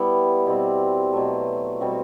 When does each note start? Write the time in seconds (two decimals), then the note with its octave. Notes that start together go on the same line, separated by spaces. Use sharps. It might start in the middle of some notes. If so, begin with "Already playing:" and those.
Already playing: G3 B3 E4 G4
0.46 B2 G3 C4
1.13 B2 F#3 A3
1.80 B2 G3 C4 F#4